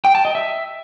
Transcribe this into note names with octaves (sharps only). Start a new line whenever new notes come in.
G5
A5
D#5
E5